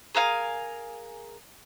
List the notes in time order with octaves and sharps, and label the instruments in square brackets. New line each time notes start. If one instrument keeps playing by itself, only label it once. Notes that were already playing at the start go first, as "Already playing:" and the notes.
[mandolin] G#4 A#4 F5 G#5